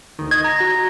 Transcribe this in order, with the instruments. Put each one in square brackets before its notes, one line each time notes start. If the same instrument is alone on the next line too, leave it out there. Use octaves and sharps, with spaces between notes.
[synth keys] D2 D#3
[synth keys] D#5 [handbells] G#6
[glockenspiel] A#5 A#6
[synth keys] F#4